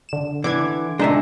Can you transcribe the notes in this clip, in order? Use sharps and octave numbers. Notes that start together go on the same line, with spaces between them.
D3 E7
D3 E3 D6 G#6
A#2 D#3 G#3 D4 D#4 E5